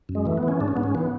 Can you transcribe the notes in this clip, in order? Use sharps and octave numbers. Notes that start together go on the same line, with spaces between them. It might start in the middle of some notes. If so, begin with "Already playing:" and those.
F#2
G#3
E3 A3
B3
E3
C#4
G#2 D4
C#4
G#2 B3
C#4
E3 B3